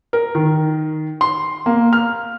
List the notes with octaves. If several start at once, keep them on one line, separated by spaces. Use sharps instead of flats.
A#4
D#3
C6
A#3
F6